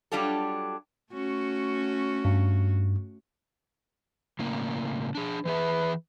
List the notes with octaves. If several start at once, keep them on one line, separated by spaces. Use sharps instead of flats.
F#3 G3 D4 F4 G4 A4
A3 C#4 F#4
G2
A2 C#3 A#3
D4 G#4
E3 G#4 B4 E5